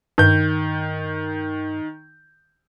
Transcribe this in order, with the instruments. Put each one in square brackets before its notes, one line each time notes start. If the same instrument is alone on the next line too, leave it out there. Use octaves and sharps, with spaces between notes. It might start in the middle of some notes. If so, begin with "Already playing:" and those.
[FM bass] G2 [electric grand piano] D#3 G6